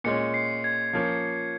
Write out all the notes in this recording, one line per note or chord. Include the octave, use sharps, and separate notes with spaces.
A#2 G#3 C#4 C#7
C7
G#6
F3 A#3 C#4